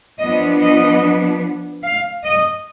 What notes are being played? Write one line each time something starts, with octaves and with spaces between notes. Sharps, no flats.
F3 B3 D4 D#5
D#5
F5
D#5